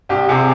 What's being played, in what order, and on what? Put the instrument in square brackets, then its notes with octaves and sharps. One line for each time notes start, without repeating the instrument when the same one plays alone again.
[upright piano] C2 G4
C3 G#4